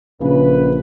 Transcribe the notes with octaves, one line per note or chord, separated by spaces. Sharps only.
A#1 F#2 C#3 B4